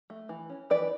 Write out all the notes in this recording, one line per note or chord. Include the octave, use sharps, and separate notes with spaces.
A3
E3
C#4
E3 B4 D5